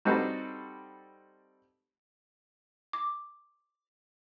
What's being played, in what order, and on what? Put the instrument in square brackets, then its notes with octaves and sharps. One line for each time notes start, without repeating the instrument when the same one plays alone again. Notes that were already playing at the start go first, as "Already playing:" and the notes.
[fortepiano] G3 C4 D#4 F#4 A4 B4
[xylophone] D6